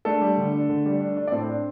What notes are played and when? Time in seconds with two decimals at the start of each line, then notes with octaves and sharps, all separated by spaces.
0.05 A3 D4 A4
0.21 G3
0.38 D3
0.54 D4
0.69 D3
0.86 G3
1.00 D4
1.17 D4
1.27 D5
1.32 A2 C4 C5
1.48 D4